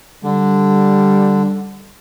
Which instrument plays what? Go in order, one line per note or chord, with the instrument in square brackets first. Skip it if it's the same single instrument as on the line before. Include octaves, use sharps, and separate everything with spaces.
[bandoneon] D3 [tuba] G3